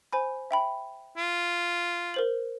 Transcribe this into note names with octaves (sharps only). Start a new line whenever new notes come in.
C5 G#5 B5
E5 G5 B5
F4
A#4 C5 F#7